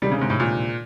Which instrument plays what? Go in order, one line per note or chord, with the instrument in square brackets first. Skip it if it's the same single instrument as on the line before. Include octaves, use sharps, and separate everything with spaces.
[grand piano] D2 C3 D#3 G#3 [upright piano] G3
[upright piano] C#3
G#2
A2
A#2